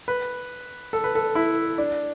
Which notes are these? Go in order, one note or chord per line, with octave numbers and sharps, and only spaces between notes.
B4
A4
B4
A4
E4
D4